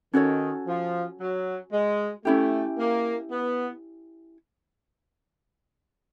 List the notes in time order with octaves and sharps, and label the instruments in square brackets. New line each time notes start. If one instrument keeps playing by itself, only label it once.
[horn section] D#3 [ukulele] C#4 F#4 A4 C#5
[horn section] F3
F#3
G#3
[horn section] A3 [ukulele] C#4 E4 G4
[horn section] A#3
B3